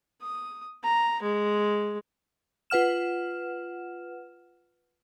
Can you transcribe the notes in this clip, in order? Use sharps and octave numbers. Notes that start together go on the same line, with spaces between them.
D#6
A#5
G#3
F4 B4 F#5 F6 E7